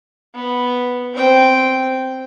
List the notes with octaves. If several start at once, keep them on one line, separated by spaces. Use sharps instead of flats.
B3
C4 G5